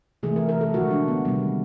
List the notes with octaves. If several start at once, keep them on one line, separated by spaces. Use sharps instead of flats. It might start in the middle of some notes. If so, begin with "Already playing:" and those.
C3 E3 A3 G#4
A#4
A#4
A4
D3 F3 G#3 F#4
D4
B3
C3 D#3 G3 B3